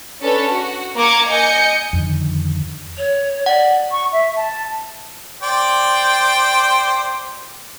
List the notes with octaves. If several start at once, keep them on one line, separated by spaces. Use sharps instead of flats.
C#4 D4 A4 B4 C#5
F#4
A#3 A#5 D6 G#6 C#7
D#5 G#5 G6 C#7
F2 D3 D#3
C#5
D5 F#5
C#6
E5
A5
C5 D5 G5